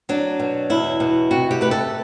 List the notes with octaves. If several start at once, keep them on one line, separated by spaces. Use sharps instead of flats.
F#3 D4
B2
E2 E4
B2
C3 F#4
G4
A3 B4
A4